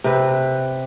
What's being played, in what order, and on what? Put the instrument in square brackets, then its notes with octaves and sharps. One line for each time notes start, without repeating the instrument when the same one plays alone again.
[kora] C3 B4